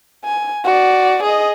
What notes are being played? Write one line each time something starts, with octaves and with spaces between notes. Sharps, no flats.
G#5
F#4 D5
G#4 D#5